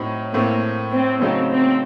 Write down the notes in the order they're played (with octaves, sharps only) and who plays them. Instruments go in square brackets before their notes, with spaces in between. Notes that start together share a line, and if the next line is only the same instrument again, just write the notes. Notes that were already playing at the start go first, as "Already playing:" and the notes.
Already playing: [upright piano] A2 F#3 C4 D#4
[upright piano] A2 A3 C4 [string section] A#3
[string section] C4
[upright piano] C#3 F#3 A3 D#4 [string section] C4
[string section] C4